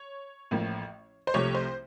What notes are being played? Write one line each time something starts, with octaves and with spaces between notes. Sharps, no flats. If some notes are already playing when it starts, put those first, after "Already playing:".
Already playing: C#5
A1 A2 F3 A#3
C5
C2 C3 F3 A3 C#5
C5